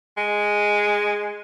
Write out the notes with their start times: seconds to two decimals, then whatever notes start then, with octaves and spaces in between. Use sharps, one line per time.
0.17 G#3